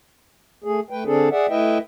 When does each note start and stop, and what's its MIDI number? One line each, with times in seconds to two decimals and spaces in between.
0.64 0.80 57
0.64 0.80 68
0.91 1.04 57
0.91 1.04 71
0.91 1.04 79
1.05 1.29 50
1.05 1.29 60
1.05 1.29 62
1.05 1.29 68
1.05 1.29 69
1.31 1.46 68
1.31 1.46 74
1.31 1.46 76
1.31 1.46 78
1.49 1.78 57
1.49 1.78 64
1.49 1.78 71
1.49 1.78 75
1.49 1.78 76
1.49 1.78 79